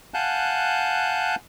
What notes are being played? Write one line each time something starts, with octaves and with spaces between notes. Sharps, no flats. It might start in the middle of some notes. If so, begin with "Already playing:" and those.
F5 F#5 G#5 A5 F#6 G6